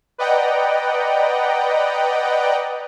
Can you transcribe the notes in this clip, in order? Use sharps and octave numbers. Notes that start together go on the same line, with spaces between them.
B4 D5 D#5 F#5 G5 A#5